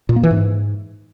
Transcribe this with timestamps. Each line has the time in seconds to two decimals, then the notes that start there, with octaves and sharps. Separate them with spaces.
0.09 A#2
0.16 A#3
0.23 E3
0.31 G#2